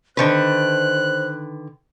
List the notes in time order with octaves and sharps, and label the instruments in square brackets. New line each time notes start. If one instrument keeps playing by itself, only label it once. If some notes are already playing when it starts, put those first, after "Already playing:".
[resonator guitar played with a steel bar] D3 D#3 B4 [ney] C5 [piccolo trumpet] F#6